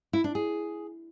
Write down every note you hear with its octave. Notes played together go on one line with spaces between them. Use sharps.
E4
D4
G#4